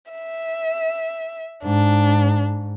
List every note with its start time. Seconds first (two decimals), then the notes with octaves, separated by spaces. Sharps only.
0.11 E5
1.64 G#2 D4